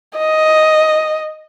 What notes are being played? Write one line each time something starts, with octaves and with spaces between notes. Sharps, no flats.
D#5